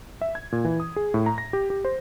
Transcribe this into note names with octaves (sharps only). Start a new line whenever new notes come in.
E5
G#6
A#2
E3
D#6
G#4
A2
A#5
A#6
G4
G4
C5